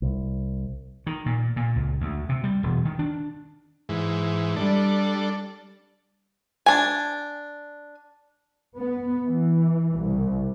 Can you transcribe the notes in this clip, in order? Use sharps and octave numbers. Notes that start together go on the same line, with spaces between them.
C2
D#3
A#2
A#2
C#2
D2
C3
G3
E1
D#3
D4
G#2 E3
G3 D4 A4
D4 G#5
B3
E3
C2